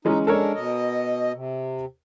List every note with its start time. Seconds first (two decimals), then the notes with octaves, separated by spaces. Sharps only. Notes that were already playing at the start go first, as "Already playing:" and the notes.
0.05 E3 G#3 C#4 D#4
0.27 G#3 D4 A4 A#4 C#5
0.54 B2 D#5
1.35 C3